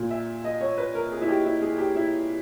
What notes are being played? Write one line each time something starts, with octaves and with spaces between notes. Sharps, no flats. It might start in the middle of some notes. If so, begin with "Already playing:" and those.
Already playing: A#2
E5
D#5
C#5
B4
A#4
G#4
E4
G4
E4
G#4
G4
E4